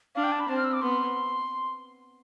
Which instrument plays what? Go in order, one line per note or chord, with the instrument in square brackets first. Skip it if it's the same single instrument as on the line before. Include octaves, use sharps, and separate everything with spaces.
[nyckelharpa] D4 [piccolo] F5
[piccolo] G5
A5
B5
[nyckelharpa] C4 [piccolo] A5
[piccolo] F6
E6
D6
[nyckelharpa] B3 [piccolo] C6